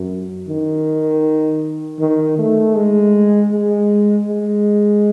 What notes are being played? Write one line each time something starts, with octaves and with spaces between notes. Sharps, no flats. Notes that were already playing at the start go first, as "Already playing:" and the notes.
Already playing: F#2
D#3
D#3
A3
G#3
G#3
G#3